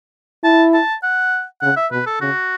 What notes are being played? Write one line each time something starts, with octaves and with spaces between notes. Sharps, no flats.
E4 A5
A5
F#5
C#3 F#5
E5
B2 B4
A4
C#3 F#4